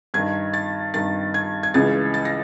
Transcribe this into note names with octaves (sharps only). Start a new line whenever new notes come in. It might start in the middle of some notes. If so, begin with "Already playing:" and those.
G2 D#3 G#6
A6
G2 D#3 A6
G#6
G#6
C#2 C#3 E3 A6
A6
A#6